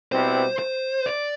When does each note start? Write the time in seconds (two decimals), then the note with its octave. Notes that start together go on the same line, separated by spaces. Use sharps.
0.12 B2 G3 C4 E4 B4 C5
0.59 C5
1.06 D5